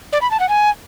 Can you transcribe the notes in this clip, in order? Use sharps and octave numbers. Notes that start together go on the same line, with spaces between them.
D5
B5
A5
F#5
G#5